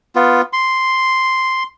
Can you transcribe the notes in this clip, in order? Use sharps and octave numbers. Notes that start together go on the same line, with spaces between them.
B3 F4
C6